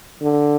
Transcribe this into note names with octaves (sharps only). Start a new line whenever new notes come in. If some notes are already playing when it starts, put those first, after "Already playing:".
D3